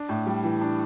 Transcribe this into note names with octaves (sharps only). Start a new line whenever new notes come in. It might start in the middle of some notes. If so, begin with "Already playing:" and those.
Already playing: D4
A2
G3
E3
D4